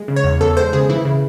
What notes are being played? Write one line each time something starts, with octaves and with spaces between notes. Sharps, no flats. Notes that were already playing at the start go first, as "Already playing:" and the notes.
Already playing: G#3
C#3
C#5
E2
E2 A4
G#3 C5
C#3 G#4
E3 E4
C#3